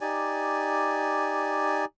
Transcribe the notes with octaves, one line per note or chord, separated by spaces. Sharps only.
D#4 G4 D5 G#5